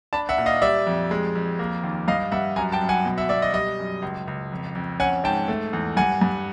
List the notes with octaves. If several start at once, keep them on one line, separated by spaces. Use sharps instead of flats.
D4 A5 B5
E5 F#5
A#2
D#5 F5
G3 D5 E5
F2
G#3
F2
A#3
D#2
G2 D#5 F5
G2 E5 F#5
F#2 G#5 A#5
G5 A5
F#2
F#5 G#5
B2
E5 F#5
B2 D5 E5
D#5
G3 D#5
F#2
C#2
C#2
F2
F2
C#4 F#5 G#5
G#2 G5 A5
A3
E2
G2 F#5 G#5
G2